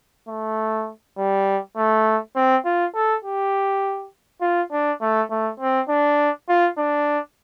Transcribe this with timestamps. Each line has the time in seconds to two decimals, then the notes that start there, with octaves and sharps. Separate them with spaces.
0.28 A3
1.18 G3
1.77 A3
2.36 C4
2.65 F4
2.95 A4
3.24 G4
4.41 F4
4.71 D4
5.01 A3
5.30 A3
5.60 C4
5.89 D4
6.49 F4
6.78 D4